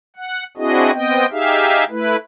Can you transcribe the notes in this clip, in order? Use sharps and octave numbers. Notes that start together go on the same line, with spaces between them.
F#5
C4 D4 E4 F#4 G#4 D#5
B3 C4 D#5 G5
D#4 G4 G#4 E5 F5
A3 E4 B4